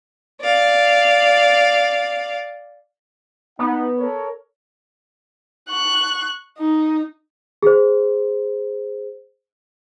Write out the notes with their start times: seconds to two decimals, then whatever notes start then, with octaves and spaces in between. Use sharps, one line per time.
0.41 D5 F5
3.59 B3 D#4 F#5
3.98 A4 A#4 C#5
5.69 C#6 F#6
6.58 D#4
7.63 G#4 C5